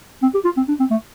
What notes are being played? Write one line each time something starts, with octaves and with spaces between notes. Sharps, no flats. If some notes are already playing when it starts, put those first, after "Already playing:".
C4
G4
F4
C4
D4
C4
A3